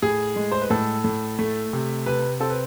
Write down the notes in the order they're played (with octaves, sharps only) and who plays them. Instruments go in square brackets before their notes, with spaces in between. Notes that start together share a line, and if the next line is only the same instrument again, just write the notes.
[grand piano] A2 G#4
G#3
C5
B4
A2 A4
A2
A3
C3
C3 B4
C4 A4
B4